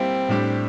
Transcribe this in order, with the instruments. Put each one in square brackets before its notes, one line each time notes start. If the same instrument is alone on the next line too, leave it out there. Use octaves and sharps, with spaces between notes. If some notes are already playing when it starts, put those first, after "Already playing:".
Already playing: [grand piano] G3 A#3 E4 [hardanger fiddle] C4
[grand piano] A2 G3 D4 G4